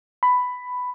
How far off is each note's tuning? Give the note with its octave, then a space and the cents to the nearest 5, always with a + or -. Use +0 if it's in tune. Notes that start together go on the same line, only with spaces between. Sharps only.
B5 +10